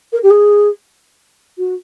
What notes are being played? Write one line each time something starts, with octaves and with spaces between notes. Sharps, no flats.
A#4
G4
G#4
F#4